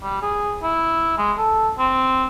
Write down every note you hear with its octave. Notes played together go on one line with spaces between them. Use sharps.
G3
G#4
E4
G#3
A4
C4